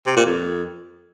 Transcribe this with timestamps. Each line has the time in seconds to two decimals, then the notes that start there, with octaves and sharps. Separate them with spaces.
0.07 C3
0.16 A#2
0.26 F2